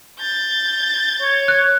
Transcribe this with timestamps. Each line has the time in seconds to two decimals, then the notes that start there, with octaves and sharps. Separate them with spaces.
0.20 G6 A6
1.20 C#5 C#6
1.48 F#6